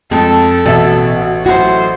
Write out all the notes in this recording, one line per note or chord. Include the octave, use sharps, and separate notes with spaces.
F2 G#3 A4
A1 B2 F#4 E5
F#3 A3 E4 F#4 C5